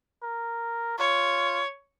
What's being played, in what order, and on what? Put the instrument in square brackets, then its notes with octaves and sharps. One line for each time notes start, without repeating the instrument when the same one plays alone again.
[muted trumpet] A#4
[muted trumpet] F4 [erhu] C#5